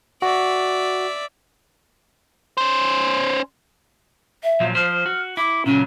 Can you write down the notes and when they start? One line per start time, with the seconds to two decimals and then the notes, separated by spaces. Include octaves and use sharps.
0.22 F#4 D5 E5
2.58 C#4 C5
4.44 E5
4.60 A#2 F3 F#3
4.75 F3 C5 F6
5.06 F#4
5.37 E4 D6
5.66 A#2 C#3 F#3 C#4